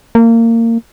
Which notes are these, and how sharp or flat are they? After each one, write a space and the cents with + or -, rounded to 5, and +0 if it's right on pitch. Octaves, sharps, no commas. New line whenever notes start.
A#3 -25